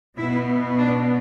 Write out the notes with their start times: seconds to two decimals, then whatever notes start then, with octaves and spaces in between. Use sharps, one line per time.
0.17 B2 B3 E4
0.78 D4